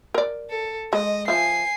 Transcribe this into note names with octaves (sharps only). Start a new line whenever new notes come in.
A#4 D5
A4
G#3 D#5
F3 E5 G#5 C7